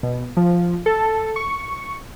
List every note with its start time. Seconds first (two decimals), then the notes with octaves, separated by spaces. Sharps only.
0.03 B2
0.37 F3
0.86 A4
1.36 C#6